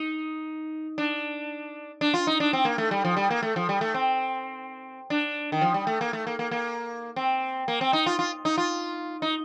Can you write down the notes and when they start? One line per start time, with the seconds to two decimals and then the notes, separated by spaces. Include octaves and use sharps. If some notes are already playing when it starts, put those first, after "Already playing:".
Already playing: D#4
0.98 D4
2.01 D4
2.14 F4
2.27 D#4
2.40 D4
2.53 C4
2.65 A#3
2.78 A3
2.91 G3
3.05 F3
3.17 G3
3.31 A#3
3.43 A3
3.56 F3
3.69 G3
3.81 A3
3.94 C4
5.10 D4
5.52 D#3
5.61 F3
5.74 G3
5.87 A3
6.01 A#3
6.13 A3
6.27 A#3
6.39 A#3
6.51 A#3
7.16 C4
7.68 A#3
7.81 C4
7.93 D#4
8.06 F4
8.19 F4
8.45 D#4
8.58 F4
9.22 D#4